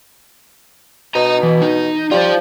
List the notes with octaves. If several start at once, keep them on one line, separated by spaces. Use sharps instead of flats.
B2 D#5 A#5
E3
D#4
G3 F4 C5